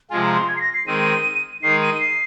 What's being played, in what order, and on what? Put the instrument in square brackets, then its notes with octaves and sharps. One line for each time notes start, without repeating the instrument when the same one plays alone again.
[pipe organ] C3 F3 G#3 F4 [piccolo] G#5
[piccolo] A#5
C6
G#6
C7
A#6
C7
[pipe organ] D#3 G#3 C4 [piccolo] D#7
[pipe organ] D#3 G#3 D#4 [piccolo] C7
[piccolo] D#7
D#7
C7